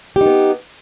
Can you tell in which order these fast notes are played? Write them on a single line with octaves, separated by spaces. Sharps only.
G4 D#4 B3